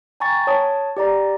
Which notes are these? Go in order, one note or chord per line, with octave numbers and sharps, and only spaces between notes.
G5 G#5 A#5 C#6 A6
C#5 A5 D#6
G4 D5 A#5